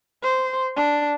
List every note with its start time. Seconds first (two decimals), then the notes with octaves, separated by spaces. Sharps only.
0.23 C5
0.77 D4